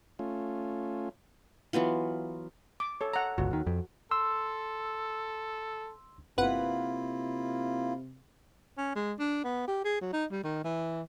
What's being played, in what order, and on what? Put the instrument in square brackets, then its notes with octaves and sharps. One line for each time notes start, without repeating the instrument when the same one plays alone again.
[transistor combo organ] A3 C#4 F4
[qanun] E3 F#3 B3 F4
[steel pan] D6
A4 C#5
F#5 A#5
[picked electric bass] G1 C#2 [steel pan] F#4
[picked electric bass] D#2 D#3
F2
[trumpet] A4 [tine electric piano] C6 E6
[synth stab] G1 B4 F#5 [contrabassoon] C3 [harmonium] A#3 E4 F4
[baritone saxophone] C#4
G#3
D4
B3
G4
G#4
F#3
D#4
G3
D#3
E3